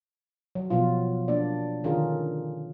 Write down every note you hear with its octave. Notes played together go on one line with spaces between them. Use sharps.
F#3
B2 F3 F#3 F4
A#3 D4 D5
D3 D#3 C#4 F4 G#4 A#4